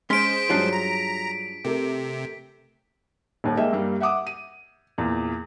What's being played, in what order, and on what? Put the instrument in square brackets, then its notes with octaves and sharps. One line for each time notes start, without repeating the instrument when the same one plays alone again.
[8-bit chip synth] G#3 C5 [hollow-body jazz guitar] C#4 C6 [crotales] B6 D7
[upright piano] G2 F#3 [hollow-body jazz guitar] D4 F4 G#4
[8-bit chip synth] A#5
[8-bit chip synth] C3 [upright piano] A3 G4 A#4
[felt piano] D#1 D#2
G#3 A#3 D#5 E5 G5
G2 G3 A#3
E5 F#5 D6 D#6
D#7
E2 A#2